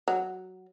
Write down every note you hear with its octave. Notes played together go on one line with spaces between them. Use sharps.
F#3